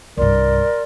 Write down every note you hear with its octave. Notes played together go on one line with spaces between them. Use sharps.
C2 G2 A#4 D5 C6